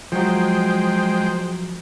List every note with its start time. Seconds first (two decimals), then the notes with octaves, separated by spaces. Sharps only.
0.12 F3 F#3 G#3 C5 G5